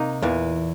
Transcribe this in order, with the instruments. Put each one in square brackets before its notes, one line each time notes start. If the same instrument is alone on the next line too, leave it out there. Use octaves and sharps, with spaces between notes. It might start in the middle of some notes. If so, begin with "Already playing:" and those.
Already playing: [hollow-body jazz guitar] C3 [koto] A#3 D#4
[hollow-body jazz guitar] E2 E3 [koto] A#2